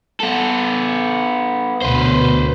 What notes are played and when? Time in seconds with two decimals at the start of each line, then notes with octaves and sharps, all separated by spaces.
0.20 B3 A4
1.82 D2 B2 B4 C5